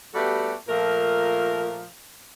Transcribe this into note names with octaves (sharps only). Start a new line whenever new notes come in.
G3 A3 B3 F#4 G4 A4
A#2 F3 A3 A#4